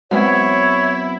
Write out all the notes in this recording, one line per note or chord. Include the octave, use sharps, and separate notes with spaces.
F#3 G#3 B3 C4 E4 C#5